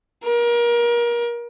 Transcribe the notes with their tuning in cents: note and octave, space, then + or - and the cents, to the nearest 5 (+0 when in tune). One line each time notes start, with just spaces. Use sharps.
A#4 +30